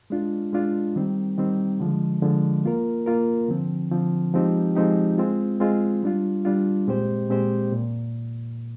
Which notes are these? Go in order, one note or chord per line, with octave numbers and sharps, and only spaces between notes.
G#3 D4 F4
G#3 D4 F4
D#3 G3 C4
D#3 G3 C4
D3 F3 G#3
D3 F3 G#3
A#3 F4 A#4
A#3 F4 A#4
D3 F3 C4
D3 F3 C4
F3 G#3 C4 D#4 G4
F3 G#3 C4 D#4 G4
G#3 C4 F4
G#3 C4 F4
G3 D4 F4
G3 D4 F4
A#2 G#3 C4 G4 C5
A#2 G#3 C4 G4 C5
A#2